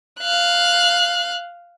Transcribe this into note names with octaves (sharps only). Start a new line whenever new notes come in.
F5 F#6